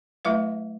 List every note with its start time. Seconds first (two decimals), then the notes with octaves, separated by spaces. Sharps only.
0.25 F#3 A3 E4 B4 E5